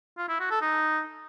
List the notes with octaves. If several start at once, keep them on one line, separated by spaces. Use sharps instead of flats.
F4
E4
F#4
A4
D#4